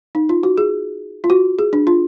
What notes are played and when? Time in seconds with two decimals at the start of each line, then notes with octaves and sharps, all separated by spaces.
0.15 D#4
0.29 F4
0.43 F#4
0.58 G#4
1.24 F4
1.30 F#4
1.59 G#4
1.73 D4
1.87 F4